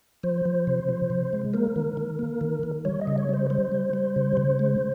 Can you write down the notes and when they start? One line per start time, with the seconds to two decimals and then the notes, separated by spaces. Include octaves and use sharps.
0.23 F3 C5
0.45 F3
0.67 C3
0.89 F3
1.10 C3
1.33 G#3
1.54 A#3 A#4
1.76 D#3
1.97 D#3
2.19 A#3
2.41 D#3
2.63 D#3
2.85 G3 C#5
3.01 D#5
3.07 C#3
3.18 C#5
3.29 G3 C5
3.50 G3 C5
3.72 G3
3.93 G3
4.16 C#3
4.37 C#3
4.59 G#3